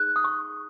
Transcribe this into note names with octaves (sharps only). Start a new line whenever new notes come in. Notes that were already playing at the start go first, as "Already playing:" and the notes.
Already playing: D#4 G#4 F#6
D#6
C#6